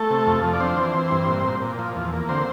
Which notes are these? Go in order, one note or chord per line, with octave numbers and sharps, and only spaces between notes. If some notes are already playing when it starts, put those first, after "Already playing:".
Already playing: A3 A4
C3
F2
F3
D5
C4 D4 C5
E3
E3
G2
A#2
A#2
A#2
F3
E2
A#3
D3 C4 C5